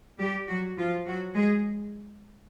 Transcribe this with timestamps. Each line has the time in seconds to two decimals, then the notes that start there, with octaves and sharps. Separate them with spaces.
0.19 G3 G4
0.49 F#3 F#4
0.77 F3 F4
1.06 F#3 F#4
1.35 G#3 G#4